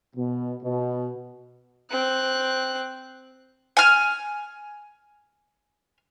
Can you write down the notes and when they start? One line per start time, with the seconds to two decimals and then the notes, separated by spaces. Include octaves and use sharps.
0.16 B2
0.62 B2
1.91 C4 F#6
3.77 G#5 F6